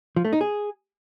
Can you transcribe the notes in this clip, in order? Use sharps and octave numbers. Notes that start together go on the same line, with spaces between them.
F3
A3
D#4
G#4